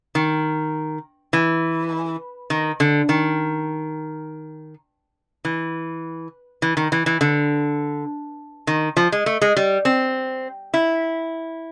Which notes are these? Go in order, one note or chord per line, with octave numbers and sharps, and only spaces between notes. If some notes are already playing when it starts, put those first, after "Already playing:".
D#3
E3
D#3
D3
D#3
E3
E3
D#3
E3
E3
D3
D#3
F3
G#3
A3
G#3
G3
C4
E4